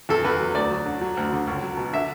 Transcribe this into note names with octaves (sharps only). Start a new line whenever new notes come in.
E2 A4
E2 B4
F#3
D2 D5
F#3
D3
F#3
D2
D3
C#2
F#3
B2
D3 E5